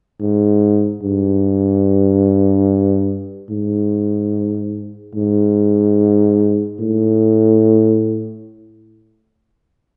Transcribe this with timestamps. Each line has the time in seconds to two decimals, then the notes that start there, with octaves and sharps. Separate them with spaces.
0.20 G#2
1.02 G2
3.50 G#2
5.15 G#2
6.79 A2